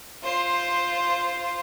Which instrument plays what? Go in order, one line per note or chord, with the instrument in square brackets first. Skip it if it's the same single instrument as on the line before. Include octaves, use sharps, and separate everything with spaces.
[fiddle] F4 C5